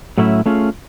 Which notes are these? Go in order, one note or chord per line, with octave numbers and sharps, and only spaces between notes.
A2 F#3 A3 C#4 E4
A3 C#4 F4 G#4